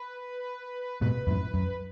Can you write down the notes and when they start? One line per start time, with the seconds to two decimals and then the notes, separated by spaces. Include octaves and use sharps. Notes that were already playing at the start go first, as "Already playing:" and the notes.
Already playing: B4
1.01 G#2 B2 B4
1.27 F#2 A2
1.54 F#2